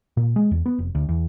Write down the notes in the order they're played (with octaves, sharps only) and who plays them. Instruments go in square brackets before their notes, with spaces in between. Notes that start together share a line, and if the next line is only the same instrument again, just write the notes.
[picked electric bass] A#2
G#3
E2
B3
F1
D2
E2